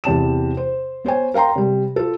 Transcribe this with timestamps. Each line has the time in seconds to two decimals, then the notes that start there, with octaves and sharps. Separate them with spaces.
0.04 E2 C3 A5 E7
0.57 C5
1.04 B3 C5 C#5 G#5
1.34 A#4 F5 G5 A#5 C6
1.56 C3 G3
1.96 F4 A4